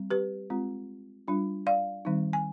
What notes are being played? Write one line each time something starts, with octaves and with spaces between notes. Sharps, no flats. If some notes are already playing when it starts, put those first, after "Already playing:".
Already playing: G3 C4
G4 B4
G#3 C4 F4
G3 D4 F4
D5 F5
D#3 G3 C4 D#4
G#5